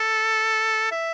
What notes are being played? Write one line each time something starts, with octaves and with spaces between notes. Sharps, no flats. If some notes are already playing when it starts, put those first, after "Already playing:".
Already playing: A4
E5